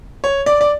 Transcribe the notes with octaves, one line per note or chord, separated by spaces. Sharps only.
C#5
D5
D5